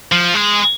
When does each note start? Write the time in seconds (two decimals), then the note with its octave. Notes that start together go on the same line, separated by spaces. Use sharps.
0.12 F3
0.34 G#3